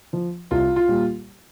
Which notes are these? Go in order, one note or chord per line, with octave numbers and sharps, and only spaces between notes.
F3
C2 F4
F4
A#2 G3